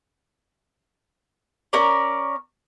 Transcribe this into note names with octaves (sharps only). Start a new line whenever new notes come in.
C#4 A#4 D5